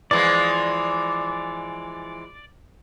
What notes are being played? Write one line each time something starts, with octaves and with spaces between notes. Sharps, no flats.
E3 F3 G#3 D5